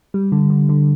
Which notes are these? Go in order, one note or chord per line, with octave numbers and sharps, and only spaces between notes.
G3
D3
D3
D3